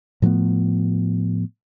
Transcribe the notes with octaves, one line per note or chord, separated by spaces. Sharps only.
A2 F3 A3 B3